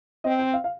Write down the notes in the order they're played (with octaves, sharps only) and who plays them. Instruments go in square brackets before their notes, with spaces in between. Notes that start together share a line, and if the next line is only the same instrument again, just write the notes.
[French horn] C4 [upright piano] D#5
[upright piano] G5
F5
F5